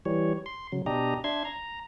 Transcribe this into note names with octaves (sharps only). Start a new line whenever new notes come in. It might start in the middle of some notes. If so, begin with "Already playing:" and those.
E3 G3 C#5
C6
C#3 F#3
B2 D4 G4 D#5 A#5
D4 E5 C6 G#6
A#5